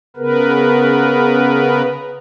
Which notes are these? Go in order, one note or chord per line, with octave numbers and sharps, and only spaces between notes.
C#3 B3 A#4 B4